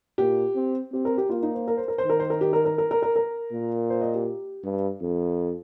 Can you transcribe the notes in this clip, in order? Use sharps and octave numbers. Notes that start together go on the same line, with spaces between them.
A#2 G4
C4
C4 G4
A#4
G4
A#3 F4
D#4
C5
A#4
C5
A#4
C5
D#3 A#4
C5
A#4
G4
A#4
A#4
A#4
A#4
A#4
A#4
A#2
C5
D#5
G4
G2
F2